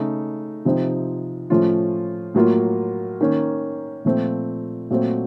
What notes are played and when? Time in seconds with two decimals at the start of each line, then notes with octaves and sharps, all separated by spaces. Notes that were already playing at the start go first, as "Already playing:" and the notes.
Already playing: C#3 A3 D#4
0.65 C3 F3 C4 D#4
1.50 A2 F3 A3 C#4 F4
2.34 A2 F#3 A#3 F4
3.21 D#3 A#3 C#4
4.05 A#2 F3 A3 C4
4.90 A#2 F#3 A3 C4